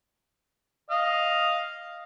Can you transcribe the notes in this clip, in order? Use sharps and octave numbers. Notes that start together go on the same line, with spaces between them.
D#5 F5